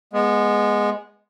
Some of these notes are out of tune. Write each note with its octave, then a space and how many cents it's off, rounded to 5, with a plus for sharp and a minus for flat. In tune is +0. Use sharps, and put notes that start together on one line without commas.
G#3 +0 B3 -20